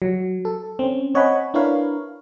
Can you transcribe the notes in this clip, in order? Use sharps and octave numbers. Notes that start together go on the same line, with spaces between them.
F#3
A4
C4 C#4
C4 C#5 D#5 F#5 G#5 B5
D4 E4 A#4 B4 C#5 F5